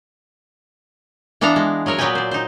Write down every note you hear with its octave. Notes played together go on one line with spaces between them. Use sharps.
E3 B3 D4 A4 F5 A#5
G#3
F#3 G#4 A#4 C#5
A#2 F#3 B3 B4 G5 G#5
C5 D5
D#4 C5